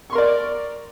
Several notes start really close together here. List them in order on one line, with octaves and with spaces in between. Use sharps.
C#6 C6 A#4 D5